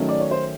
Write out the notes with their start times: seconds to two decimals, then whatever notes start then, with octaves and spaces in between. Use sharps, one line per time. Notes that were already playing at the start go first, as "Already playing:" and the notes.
Already playing: D#3 F#3 A3 C#4
0.08 D5
0.20 C#5
0.31 C5